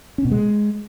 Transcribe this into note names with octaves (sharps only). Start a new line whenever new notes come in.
C#4
B2
G#3